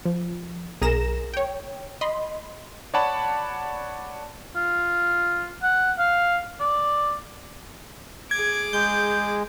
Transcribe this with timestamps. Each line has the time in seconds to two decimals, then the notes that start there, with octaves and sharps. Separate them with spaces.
0.06 F3
0.82 B1 G#4 A#4 A#5 A#6 E7
1.34 C#5 G5
2.01 D#5 B5 C6
2.94 C#5 D5 F#5 A5 B5
4.55 F4
5.63 F#5
5.99 F5
6.60 D5
8.31 G#4 D6 G#6
8.73 G#3 G6